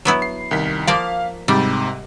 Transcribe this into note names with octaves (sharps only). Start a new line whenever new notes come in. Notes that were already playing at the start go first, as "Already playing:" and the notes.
F#3 B3 E4
C7
C2 D#3 B6
F3 A#3 D5 F5
G#2 C3 G3